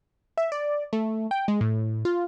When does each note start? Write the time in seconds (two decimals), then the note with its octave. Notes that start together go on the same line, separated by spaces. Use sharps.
0.37 E5
0.52 D5
0.93 A3
1.31 G5
1.48 G#3
1.61 A2
2.05 F4